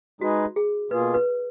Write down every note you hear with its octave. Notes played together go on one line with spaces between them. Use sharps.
G#3 D#4 F#4 G#4 B4 D#5
G#4
B2 A#3 F4 G#4 B4
B4